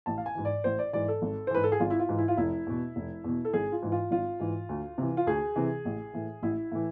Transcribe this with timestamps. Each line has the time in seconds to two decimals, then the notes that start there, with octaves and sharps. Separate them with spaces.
0.06 A1 A5
0.18 F5
0.26 G#5
0.35 G#2 E3
0.45 D5
0.64 A1 C5
0.79 D5
0.93 G#2 E3 D5
1.08 A4
1.22 G#1
1.47 C5
1.51 G#2 E3 B4
1.64 A4
1.72 G#4
1.80 G#1 F4
1.90 E4
1.99 F4
2.09 G#2 E3
2.18 E4
2.28 F4
2.38 F1 E4
2.66 E2 B2
2.96 F1
3.24 E2 B2
3.45 A4
3.53 G#1 G#4
3.72 F4
3.83 G#2 E3
3.92 F4
4.11 G#1 F4
4.40 G#2 E3
4.69 D2
4.98 C3 E3
5.17 F4
5.26 D2 G#4
5.56 C3 E3
5.85 A1
6.13 A2 E3
6.43 A1 E4
6.72 A2 E3